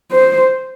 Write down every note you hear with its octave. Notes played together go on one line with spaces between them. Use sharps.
C5